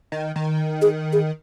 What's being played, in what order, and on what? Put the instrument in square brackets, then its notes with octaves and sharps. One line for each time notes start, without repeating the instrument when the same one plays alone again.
[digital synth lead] D#3
D#3
[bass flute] G#4
G#4